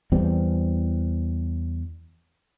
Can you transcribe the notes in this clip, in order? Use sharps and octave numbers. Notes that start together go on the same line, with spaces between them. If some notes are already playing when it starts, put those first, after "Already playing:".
E2 E3 G3 C4